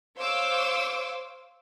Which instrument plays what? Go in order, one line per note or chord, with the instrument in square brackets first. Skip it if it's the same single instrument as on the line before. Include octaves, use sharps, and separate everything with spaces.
[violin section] C5 C#5 F5 C6 D6 E6